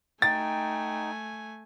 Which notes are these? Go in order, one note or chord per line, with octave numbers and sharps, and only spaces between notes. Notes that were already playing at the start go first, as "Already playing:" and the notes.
A3 D#4 G5 G#5 A6